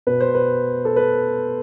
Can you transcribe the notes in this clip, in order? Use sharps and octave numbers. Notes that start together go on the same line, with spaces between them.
B2 B4
C5
B4
A4
B4